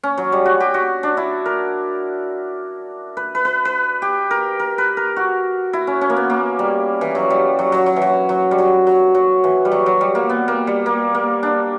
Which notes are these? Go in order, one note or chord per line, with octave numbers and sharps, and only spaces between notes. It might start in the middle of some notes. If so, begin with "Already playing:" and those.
C#4
F#3
G3
F#4
G4
F#4
D4
E4
A#4
B4
B4
B4
B4
G4
A#4
A#4
B4
A#4
F#4
E4
C#4
C#4
A#3
B3
A#3
G3
E3
F#3
G3
F#3
F#3
F#3
E3
F#3
F#3
G3
F#3
F#3
F#3
E3
G3
F#3
F#3
G3
A#3
B3
A#3
G3
A#3
A#3
D4